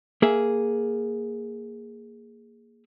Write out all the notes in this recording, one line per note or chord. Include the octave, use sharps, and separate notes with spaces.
A#3 G#4 E5